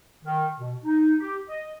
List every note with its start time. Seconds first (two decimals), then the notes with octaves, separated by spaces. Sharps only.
0.25 D#3
0.57 B2
0.83 D#4
1.19 G4
1.47 D#5